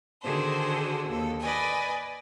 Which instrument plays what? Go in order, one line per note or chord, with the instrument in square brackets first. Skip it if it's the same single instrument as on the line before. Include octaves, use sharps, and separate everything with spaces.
[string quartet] D3 D#3 F#4 G#4 A4 C5
D#2 A4
B4 D5 D#5 G#5